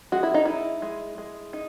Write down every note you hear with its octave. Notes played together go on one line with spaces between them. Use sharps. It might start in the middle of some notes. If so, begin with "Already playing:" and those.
G#3 F#4
E4
D#4
D#4 E4
G#3
G#3
D#4